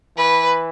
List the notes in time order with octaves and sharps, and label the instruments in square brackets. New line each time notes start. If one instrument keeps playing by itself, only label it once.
[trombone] E3 [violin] B4